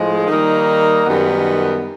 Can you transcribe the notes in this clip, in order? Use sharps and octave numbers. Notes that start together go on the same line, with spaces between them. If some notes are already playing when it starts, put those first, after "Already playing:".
Already playing: A2 F3 G#3
D#3 G3 A#3 D#4
F#2 D#3 G3 B3